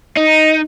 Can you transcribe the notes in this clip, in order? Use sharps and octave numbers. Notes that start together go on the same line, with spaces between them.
D#4